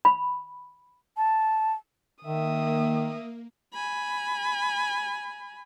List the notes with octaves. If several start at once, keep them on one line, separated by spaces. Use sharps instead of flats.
B5
A5
D#3 A#3 E5 D#6
G#5 B5